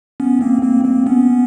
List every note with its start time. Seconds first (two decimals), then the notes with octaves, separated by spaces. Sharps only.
0.20 B3 C#4
0.41 A#3 C4
0.62 A#3 C4
0.85 A#3 C4
1.06 B3 C#4